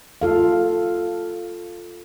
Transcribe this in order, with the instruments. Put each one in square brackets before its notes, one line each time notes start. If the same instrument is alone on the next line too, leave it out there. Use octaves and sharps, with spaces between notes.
[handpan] F4 A4 F5